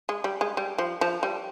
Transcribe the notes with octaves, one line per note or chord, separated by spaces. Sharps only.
G#3
G3
G#3
G3
F3
F3
G3